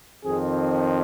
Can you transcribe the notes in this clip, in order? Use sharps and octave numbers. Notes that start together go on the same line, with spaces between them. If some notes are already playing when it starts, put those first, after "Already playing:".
F2 D#3 C4 G#4